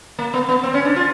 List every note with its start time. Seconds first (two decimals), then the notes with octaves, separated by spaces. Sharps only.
0.19 A#3
0.34 B3
0.48 B3
0.63 C4
0.74 C#4
0.85 D4
0.96 F4